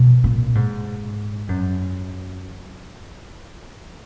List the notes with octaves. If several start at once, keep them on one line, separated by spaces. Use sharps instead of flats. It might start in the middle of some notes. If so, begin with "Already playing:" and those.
Already playing: B2
A#2
G#2
F#2